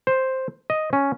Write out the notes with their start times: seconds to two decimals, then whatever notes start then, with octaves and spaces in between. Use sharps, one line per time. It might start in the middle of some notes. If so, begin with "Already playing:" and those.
0.07 C5
0.70 D#5
0.93 C#4